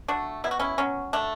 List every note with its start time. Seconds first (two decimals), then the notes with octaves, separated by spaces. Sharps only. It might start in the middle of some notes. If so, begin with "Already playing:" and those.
0.08 A3 D4 F#4
0.44 B2 E4
0.51 F#4
0.60 C#4 E4
0.78 F#3 C#4
1.13 A3 D4